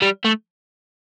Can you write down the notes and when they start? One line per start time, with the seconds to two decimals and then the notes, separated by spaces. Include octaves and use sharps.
0.02 G3
0.24 A3